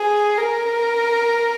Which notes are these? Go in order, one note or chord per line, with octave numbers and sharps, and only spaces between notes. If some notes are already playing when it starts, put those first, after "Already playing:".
Already playing: G#4
A#4